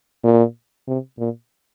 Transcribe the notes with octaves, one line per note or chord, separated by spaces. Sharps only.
A#2
C3
A#2